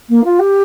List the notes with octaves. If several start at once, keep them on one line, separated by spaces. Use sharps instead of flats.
A#3
F4
G4